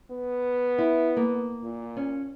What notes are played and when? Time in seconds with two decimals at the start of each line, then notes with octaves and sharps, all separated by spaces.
0.11 B3
0.78 E4
1.17 A#3
1.63 A#2
1.97 C#4